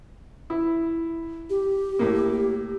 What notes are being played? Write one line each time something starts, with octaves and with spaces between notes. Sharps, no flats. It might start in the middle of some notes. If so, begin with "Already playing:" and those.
E4
G4
A2 A#3